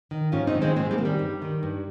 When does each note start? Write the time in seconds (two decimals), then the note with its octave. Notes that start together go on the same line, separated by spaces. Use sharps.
0.11 D#3
0.32 G#2 C#4 F4
0.47 C4 D#4
0.55 D#3
0.62 G#3 C4
0.76 G#2 G#3 C4
0.91 G3 A#3
0.98 D#3
1.05 G3
1.19 G2
1.42 D#3
1.63 G2